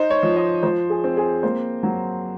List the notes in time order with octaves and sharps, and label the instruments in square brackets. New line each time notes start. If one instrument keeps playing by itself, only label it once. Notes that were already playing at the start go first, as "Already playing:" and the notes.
Already playing: [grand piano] D#4 C5
C#5
F3
D#5
F3 C5
G#4
C4
G#4
A#3 C5
F#3